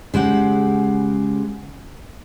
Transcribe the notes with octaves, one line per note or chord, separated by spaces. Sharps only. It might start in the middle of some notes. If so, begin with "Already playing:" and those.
C#3 G#3 G4 F#5